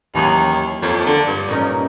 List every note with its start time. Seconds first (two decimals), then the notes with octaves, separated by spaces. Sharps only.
0.15 D#2 E3 F#3 G#4
0.82 F2 A#3 C#5
1.07 D3
1.28 G2
1.49 A#2 C#4 D#4